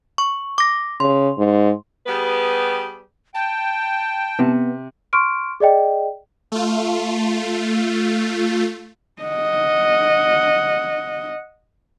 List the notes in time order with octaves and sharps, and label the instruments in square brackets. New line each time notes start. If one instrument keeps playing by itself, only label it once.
[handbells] C#6
D6 A#6
[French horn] C#3 [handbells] C6
[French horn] G#2
[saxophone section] G3 B3 G4 G#4 B4
[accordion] G5 [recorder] A5
[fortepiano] C3 [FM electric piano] B3
[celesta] C6 C#6 F6 D7
G#4 D5 D#5 G5
[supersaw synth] A3 F4
[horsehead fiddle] D#5 F#5